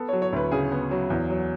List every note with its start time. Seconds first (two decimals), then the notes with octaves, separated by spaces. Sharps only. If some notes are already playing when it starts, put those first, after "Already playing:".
Already playing: B3 A4
0.08 F#3 C#5
0.22 C#5
0.33 D2 B4
0.52 C#3 G#4
0.72 B3
0.91 F#3
1.10 E2
1.30 F#3